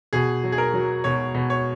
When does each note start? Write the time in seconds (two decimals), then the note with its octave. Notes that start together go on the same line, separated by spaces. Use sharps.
0.13 B2 G#4
0.44 F#3
0.52 G#4
0.58 A#4
0.73 F#3
1.04 B2 C#5
1.35 B2
1.50 C#5